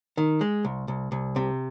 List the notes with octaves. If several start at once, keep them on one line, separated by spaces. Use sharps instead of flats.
D#3
G#3
C2
C2
C2
C3